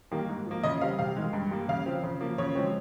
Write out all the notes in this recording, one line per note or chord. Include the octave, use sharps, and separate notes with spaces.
D#3 G3 A#3
G#2
F3 A#3
C#3 D#5
G3 C4 F5
C3 F5
D#3 G#3
G2
G3 A#3
C#3 F5
F3 C4
C#3
F3 A#3
C#3 C#5
F3 G#3 C4